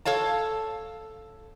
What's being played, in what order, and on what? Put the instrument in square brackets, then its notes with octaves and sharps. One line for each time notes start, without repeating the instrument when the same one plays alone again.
[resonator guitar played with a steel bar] A4 C#5 F5 A5